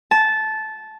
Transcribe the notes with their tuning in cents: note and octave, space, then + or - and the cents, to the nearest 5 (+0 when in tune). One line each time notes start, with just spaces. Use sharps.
A5 -15